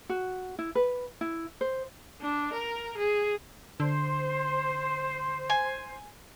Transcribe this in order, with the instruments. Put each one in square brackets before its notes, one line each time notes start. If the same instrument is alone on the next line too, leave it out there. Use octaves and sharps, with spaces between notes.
[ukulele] F#4
E4
B4
E4
C5
[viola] D4
A#4
G#4
[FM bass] D3 [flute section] C5
[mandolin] G#5